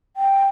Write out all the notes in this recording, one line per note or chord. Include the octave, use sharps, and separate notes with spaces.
G5